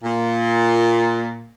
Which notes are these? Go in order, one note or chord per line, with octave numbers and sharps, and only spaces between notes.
A#2